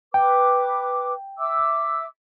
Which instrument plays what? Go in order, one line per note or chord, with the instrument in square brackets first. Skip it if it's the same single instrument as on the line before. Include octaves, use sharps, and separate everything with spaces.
[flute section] B4 D6 [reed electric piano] G5
[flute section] E5 D6 E6